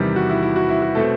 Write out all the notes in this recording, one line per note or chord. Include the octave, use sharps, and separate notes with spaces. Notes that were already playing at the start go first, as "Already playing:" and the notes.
Already playing: E2 C3 D#3 G3
F#4
E4
E4
F#4
E4
F#4
B2 A3 C4 A4